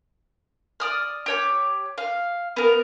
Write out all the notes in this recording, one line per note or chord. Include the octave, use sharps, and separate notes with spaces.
D5 D#6 F6
G4 C#5 D6
F5
B3 A#4